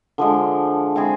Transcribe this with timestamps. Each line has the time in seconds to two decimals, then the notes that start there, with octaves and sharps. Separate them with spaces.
0.18 D3 F3 G#3
0.96 G#3 C4 E4 G#4